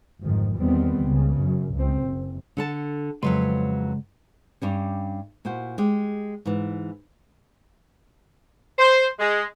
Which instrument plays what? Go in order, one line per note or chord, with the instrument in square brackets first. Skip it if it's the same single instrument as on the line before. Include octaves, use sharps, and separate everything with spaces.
[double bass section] G1 F2 G#2 D#3 F3
E2 D#3 G3 B3 C4
C#2 C#3
F#2
C#2 C4
F#1
[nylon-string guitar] D3 A4 A5
[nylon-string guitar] F2 F#3 B4 [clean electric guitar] C#3 G#3 C6
[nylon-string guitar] G2 G3 C#4
A#2 E4 F#4 C5
G#3 G4
G#2 E3
[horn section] C5
G#3